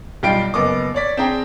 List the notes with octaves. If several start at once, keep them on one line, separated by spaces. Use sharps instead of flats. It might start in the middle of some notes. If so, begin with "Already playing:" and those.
B1 G3 F4 G5 C7 D7
F#1 B3 D#5 D6
C#5 D5 B6
C4 D4 G#4 G5 A#5